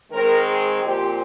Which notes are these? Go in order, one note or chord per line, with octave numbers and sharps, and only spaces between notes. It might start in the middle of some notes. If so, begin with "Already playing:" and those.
D#3 G#3 C4 A#4
G#4
A#2 F3 C4 G4